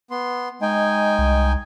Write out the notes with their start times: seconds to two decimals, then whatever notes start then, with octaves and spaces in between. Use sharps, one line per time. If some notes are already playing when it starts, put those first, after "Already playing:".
0.11 B3 C6
0.62 G#3 D#4 G5 G#5
1.19 C2